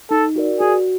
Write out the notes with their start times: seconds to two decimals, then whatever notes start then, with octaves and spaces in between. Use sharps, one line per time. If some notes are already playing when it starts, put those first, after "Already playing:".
0.11 D#4 A4
0.36 F#4 A#4 D5
0.60 F#4 G#4